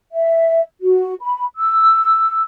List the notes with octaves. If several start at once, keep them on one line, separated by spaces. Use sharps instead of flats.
E5
F#4
B5
E6